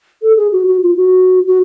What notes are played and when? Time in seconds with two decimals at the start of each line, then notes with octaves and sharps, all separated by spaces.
0.22 A4
0.37 G#4
0.52 F#4
0.67 F#4
0.82 F4
0.97 F#4
1.47 F#4